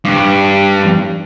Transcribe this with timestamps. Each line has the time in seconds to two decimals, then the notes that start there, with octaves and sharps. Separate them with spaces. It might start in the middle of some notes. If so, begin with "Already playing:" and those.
0.05 G2